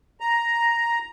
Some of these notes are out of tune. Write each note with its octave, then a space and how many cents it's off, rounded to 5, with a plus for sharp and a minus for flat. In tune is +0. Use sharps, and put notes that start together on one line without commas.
A#5 +5